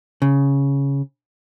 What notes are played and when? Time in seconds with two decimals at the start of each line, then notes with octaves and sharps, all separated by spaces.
0.22 C#3